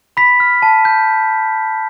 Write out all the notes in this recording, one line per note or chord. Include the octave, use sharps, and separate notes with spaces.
B5 B6
F6
A5
G6